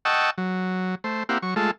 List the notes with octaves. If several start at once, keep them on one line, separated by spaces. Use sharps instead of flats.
D#5 F#5 G5 A5 C#6 E6
F#3
A3 C5
A#3 C4 E4 G4 F5 F#5
F#3 C#6
G#3 A3 F4 A4